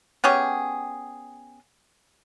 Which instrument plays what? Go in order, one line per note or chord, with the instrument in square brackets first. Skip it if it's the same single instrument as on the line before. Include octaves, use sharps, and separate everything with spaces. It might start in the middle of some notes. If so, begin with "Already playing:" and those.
[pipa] B3 C#4 G4 G#4